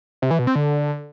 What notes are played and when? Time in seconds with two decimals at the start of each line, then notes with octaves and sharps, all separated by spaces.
0.22 C3
0.31 E3
0.39 B2
0.47 C4
0.55 D3